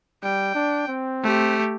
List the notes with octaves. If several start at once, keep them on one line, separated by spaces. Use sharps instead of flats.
G3 G5
D4
C4
A3 G4